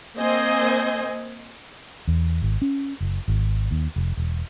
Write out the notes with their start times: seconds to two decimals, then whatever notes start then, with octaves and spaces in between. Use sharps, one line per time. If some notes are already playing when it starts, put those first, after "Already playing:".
0.19 A#3 C4 C5 D#5 G#5
2.08 E2
2.42 G#1
2.62 C#4
3.01 F#1
3.28 G#1
3.71 D#2
3.96 F1
4.17 E1